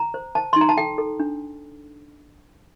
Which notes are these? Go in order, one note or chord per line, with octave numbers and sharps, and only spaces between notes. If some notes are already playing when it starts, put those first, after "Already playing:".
Already playing: A#5
C5
C5 A5
D#4 C6
A#5
A5
A4 G5
A4
D4